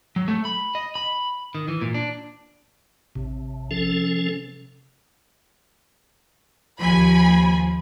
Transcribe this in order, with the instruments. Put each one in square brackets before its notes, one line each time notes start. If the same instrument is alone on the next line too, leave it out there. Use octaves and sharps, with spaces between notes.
[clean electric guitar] F#3
A3
B5
D#5
B5
D#3
E3
A#2
D4
[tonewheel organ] A1 [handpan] C3
[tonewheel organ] F3 C#4 A4
[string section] D#2 G#5 B5 [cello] F3